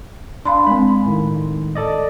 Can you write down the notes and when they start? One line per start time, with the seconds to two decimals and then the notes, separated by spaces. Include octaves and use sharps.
0.45 D4 F5 B5 C6
0.67 G#3 C4 B5
1.06 A2 D#3
1.75 A4 D5 D#5